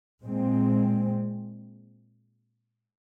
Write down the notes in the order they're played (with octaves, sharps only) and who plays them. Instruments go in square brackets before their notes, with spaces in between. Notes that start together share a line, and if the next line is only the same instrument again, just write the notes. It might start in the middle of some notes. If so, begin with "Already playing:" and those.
[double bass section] A#2 G#3 C4